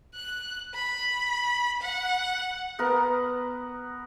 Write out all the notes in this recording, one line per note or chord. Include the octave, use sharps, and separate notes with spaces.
F#6
B5
F#5
B3 A#4